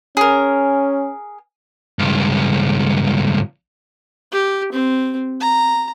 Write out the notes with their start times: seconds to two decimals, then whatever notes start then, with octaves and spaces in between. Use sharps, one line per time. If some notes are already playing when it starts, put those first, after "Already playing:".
0.17 C#4 G#4 A#4
1.99 C#2 G2
4.32 G4
4.72 C4
5.40 A#5